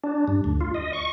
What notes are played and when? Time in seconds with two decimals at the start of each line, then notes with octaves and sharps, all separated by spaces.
0.04 D4
0.28 G2
0.44 D2
0.61 F4
0.74 D#5
0.93 C#6